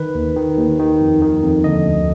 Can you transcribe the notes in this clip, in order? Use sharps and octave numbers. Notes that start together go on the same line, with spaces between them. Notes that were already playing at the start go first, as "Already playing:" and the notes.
Already playing: D#3 B4
D#2
D#3
D#2
D#3
F2
D#3
F2
D3 D#5
D2